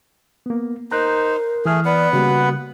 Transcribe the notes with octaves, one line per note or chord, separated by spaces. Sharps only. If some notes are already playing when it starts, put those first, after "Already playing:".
A#3 B3
D#4 A#4 C5 A#5 F#6
E3 A3 G#4 F6
B3 B4 D5 F#5
C#3 G3 A#3 F#4